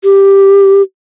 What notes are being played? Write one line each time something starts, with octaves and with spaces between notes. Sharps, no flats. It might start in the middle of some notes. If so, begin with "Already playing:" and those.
G4